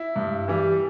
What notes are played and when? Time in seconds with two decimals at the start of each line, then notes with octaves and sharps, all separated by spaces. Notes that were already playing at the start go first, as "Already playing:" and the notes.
Already playing: E4
0.16 G2
0.48 E3 G3